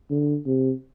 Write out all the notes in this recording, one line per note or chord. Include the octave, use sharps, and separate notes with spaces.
D3
C3